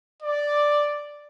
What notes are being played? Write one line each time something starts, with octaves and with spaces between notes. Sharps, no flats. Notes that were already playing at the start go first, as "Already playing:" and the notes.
D5